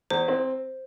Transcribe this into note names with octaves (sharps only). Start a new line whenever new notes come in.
E2 C5
C4